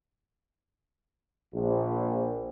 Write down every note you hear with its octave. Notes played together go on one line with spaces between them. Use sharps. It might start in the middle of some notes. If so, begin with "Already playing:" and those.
A#1